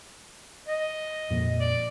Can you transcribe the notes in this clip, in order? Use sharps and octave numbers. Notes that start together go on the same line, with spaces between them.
D#5
F2 A#2
D5